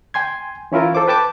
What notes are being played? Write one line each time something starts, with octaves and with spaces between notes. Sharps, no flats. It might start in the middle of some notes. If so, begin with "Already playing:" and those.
G5 G#5 C6 G#6
E3 C#4 E4 F4 A#4
A4 C5 D6
B4 G5 A5 D6